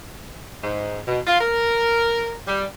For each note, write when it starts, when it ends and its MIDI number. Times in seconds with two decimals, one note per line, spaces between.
0.63 0.98 44
1.08 1.20 47
1.27 1.40 65
1.41 2.34 70
2.48 2.65 55